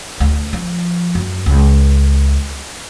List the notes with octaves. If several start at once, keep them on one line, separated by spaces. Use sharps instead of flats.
D2
F3
F#2
C#2